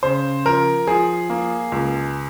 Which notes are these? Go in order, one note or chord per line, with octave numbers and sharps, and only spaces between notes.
C#3 C5
F3 A#4
F3 G#4
A#3
C#2